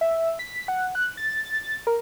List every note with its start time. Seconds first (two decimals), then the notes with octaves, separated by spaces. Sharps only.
0.01 E5
0.39 B6
0.68 F#5
0.95 F#6
1.17 A6
1.87 A#4